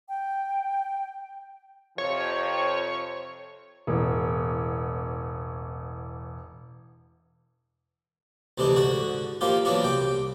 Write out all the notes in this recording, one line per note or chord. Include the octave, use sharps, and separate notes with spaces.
G5
F2 C3 F3 C#5
E1 A1
D2 C3 E3 D4 D#4
G#2 D3 F#4
D#3 F3 G3 A#3 F4 G4
E3 F#3 A#3 B3 D4 F4
C2 G5 D6